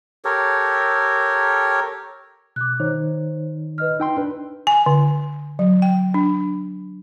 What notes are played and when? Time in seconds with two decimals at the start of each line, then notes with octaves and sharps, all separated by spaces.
0.25 G4 A4 A#4 C#5
2.56 B2 D6 F#6
2.80 D#3 D#4 C5 C#5
3.78 B4 D#5 F6
4.00 D#4 G5 C6 E6
4.17 D4 B4
4.67 G#5
4.86 D3
5.59 F#3
5.82 G5
6.14 D4